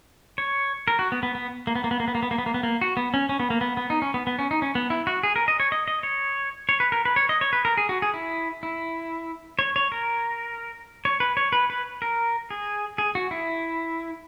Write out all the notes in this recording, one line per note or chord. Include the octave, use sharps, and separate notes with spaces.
C#5
A#4
F#4
B3
B3
B3
A#3
B3
A#3
B3
A#3
B3
A#3
B3
A#3
B3
A#3
B3
A#3
F#4
B3
C#4
C#4
B3
A#3
B3
B3
D#4
C#4
B3
B3
C#4
D#4
C#4
B3
E4
F#4
G#4
A#4
D#5
C#5
D#5
D#5
C#5
C#5
B4
A#4
B4
C#5
D#5
C#5
B4
A#4
G#4
F#4
G#4
E4
E4
C#5
C#5
A#4
C#5
B4
C#5
B4
B4
A#4
G#4
G#4
F#4
E4